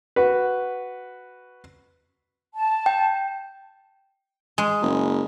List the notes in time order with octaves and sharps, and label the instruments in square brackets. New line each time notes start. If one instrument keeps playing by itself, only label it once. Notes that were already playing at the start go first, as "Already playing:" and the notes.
[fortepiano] F#4 B4
[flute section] A5
[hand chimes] G5
[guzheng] G#3
[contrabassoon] F#1